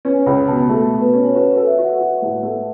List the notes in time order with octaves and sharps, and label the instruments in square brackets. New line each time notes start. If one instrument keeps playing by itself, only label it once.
[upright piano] C#4 [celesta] B4
[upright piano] C#2 [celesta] B5
[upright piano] B2 [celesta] A5
[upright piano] A3 [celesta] A5
[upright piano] B2
[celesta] B4
[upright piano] C#4
[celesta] C#5
[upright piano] F#4 [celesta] B4
[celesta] B4
[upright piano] A4
[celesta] E5
[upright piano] F#4
[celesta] F#5
[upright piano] F#4
A2
A3